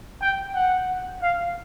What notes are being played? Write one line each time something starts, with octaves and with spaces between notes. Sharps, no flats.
G5
F#5
F5